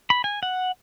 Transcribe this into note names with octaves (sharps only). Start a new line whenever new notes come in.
B5
G#5
F#5